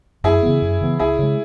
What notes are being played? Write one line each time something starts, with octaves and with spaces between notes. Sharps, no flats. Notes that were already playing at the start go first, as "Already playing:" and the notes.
F#2 E4 G#4
C#3 E3 B3
F#2
C#3 E3 B3
C#2 E4 G#4
C#3 G#3